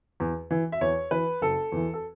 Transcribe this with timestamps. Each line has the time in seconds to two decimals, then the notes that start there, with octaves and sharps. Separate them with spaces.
0.20 E2
0.51 E3
0.72 E5
0.81 E2 C#5
1.11 E3 B4
1.42 F#1 A4
1.72 E2 E3
1.94 A4